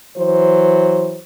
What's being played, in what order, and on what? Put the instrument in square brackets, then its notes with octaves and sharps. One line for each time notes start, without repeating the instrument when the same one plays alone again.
[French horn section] E3 F#3 C5